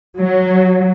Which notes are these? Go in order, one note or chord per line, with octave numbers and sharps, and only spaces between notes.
F#3